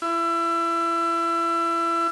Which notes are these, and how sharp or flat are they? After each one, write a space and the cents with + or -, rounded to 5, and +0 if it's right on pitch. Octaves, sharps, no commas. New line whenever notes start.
E4 +30